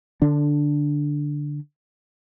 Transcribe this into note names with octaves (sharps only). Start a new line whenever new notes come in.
D3 D4